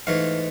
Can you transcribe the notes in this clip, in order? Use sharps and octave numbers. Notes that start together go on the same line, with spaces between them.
G#2 E3 A3 F5